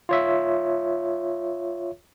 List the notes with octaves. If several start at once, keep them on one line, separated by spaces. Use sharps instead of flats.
F4 C#5 E5